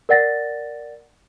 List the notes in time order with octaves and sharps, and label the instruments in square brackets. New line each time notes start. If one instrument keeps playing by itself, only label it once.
[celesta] A#4 D5 F#5 A6 A#6